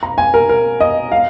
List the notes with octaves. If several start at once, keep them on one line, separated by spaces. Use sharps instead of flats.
A#5
G#5
A#4
A#4
D#5
F5